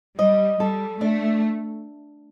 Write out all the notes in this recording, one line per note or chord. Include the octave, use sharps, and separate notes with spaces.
G3 D#5
G3 A4
A3 D4